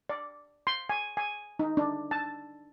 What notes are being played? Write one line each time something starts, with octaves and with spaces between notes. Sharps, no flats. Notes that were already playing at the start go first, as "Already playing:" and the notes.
D5
C6
G#5
G#5
D#4
D4
A5